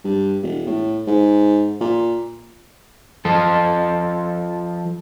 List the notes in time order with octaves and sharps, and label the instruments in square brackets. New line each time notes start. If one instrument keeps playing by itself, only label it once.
[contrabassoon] G2
E1
A2
G#2
A#2
[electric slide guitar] F3 A4